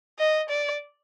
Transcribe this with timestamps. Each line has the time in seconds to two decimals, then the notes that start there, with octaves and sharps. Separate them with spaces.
0.19 D#5
0.49 D5